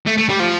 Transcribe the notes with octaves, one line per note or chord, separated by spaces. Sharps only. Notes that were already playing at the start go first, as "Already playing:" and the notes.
A3
A3
G3
F3